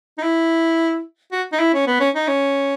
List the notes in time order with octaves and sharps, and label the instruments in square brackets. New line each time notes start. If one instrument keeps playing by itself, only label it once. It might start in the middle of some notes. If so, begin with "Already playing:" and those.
[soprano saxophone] D#4
E4
F#4
D#4
E4
C#4
B3
C#4
D#4
C#4